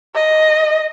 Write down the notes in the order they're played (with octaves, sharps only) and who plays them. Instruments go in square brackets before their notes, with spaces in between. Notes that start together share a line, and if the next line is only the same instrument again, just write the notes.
[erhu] D#5